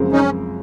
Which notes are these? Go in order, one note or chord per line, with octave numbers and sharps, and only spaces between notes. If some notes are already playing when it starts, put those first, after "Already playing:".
Already playing: F#2 C#3 F3 G#3 C4
C#4 D#4